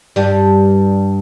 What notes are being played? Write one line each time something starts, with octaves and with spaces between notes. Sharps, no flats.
G2 G3